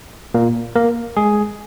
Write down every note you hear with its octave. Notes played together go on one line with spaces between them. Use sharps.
A#2 A#3
A#3 A#4
G#3 G#4